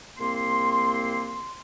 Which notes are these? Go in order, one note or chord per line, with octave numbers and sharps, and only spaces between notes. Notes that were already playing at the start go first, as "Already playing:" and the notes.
C2 A#3 C4 C6